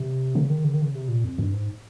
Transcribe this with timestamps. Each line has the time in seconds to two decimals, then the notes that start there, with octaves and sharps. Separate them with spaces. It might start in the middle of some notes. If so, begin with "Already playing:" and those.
Already playing: C3
0.35 C#3
0.50 D#3
0.64 C#3
0.74 D#3
0.82 C#3
0.95 C3
1.08 A#2
1.24 F2
1.38 G2
1.53 G#2